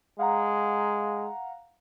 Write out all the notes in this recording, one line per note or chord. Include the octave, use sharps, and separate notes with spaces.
G#3 F5 F#5 A#5